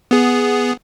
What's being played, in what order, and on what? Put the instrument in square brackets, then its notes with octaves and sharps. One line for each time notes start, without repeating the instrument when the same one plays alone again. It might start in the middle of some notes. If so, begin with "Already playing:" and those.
[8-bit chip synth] B3 G#4